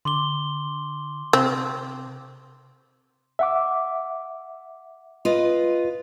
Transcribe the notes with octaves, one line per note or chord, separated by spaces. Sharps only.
D3 C6 D6 G7
C3 C4
E5 F#5 D6
F4 B4 D#5